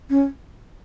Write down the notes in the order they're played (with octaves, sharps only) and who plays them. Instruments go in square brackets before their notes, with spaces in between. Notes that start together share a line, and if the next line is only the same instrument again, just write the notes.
[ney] C#4